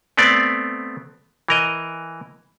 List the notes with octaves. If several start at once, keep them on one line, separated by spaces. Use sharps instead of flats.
A3 B3 C4 D5
E3 A#4 D#5